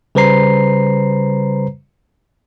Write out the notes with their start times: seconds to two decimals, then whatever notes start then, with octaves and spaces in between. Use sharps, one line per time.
0.15 C#3 G3 B4 C5 A#5 C7